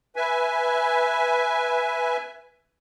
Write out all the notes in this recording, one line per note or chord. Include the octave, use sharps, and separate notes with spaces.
B4 E5 G#5